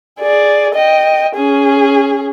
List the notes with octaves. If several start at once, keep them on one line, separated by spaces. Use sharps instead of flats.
G#4 D5
D#5 G5
C#4 G#4